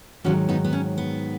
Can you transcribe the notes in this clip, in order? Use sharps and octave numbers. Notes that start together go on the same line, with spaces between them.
G#2 D#3 F#3 C#4 F#4
B3 D#4
B3
C#4
B3